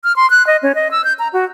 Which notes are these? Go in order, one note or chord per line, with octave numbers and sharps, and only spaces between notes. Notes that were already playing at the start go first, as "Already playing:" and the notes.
F6
C6
F#6
D#5
C#4
D#5
E6
G6
A#5
F#4